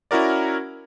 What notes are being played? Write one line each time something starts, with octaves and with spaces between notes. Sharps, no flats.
C#4 E4 F#4 A#4 D5